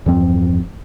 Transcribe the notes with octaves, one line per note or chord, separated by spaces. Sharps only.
E2 G2 F3 C4